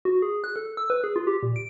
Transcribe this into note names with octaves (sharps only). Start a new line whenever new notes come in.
F#4
G#4
F#6
A4
E6
B4
G#4
F4
G4
A#2
D7